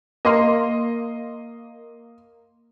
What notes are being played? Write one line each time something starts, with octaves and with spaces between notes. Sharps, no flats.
A#3 D#5 C6